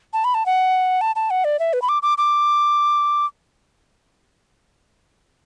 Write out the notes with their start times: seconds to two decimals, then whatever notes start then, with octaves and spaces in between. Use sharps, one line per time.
0.13 A5
0.24 B5
0.34 A5
0.46 F#5
1.01 A5
1.16 A5
1.30 F#5
1.44 D5
1.59 E5
1.73 B4
1.82 B5
1.89 D6
2.03 D6
2.18 D6